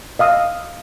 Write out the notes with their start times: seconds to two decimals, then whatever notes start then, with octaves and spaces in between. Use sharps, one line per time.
0.19 D#5 F5 D#6 E6